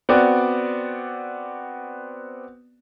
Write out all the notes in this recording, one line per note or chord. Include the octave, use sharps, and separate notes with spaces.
B3 C4 F#4 D5